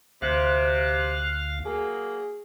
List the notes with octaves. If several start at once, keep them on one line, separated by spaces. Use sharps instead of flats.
D2 C3 F5 F#6
F#3 A#3 G#4